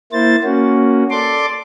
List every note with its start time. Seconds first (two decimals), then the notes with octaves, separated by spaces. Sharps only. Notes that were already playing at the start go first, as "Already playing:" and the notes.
0.13 A#3 E4 C5 A6
0.44 A#3 C#4 F#4
1.10 A4 D5 C6 D6